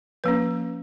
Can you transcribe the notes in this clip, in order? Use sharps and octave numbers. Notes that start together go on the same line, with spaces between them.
F3 A#3 C#4 B4